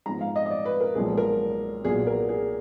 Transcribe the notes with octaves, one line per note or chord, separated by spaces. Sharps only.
G#2 F3 G#3 B3 A#5
F5
D#5
D#5
D5
B4
A#4
B1 A#2 F3 G#3 B3 G#4
A#4
B1 A#2 F#3 B3 G#4
A#4
G#4